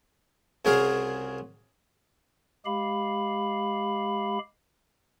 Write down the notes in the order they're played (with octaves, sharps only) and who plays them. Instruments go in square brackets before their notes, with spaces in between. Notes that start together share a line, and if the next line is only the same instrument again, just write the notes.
[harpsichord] C2 C#3 F#4 G#4 A#4 F5
[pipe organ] G#3 G4 F5 B5